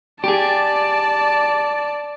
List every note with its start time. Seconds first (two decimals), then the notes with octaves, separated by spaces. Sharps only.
0.24 G4 G#4 D5 A5